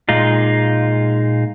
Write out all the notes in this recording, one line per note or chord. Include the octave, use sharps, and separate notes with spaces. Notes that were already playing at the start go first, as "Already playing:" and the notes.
A#2 G#3 D#4 F4